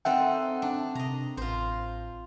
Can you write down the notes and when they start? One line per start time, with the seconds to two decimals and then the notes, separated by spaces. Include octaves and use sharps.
0.05 C4 D#4 A4 E5 F#5 G5
0.62 D4
0.95 C3 D#5 A#5
1.37 A1 F4 C5